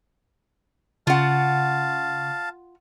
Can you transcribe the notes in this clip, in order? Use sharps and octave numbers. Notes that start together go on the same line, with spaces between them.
C#3 F4 F5 F#5 A5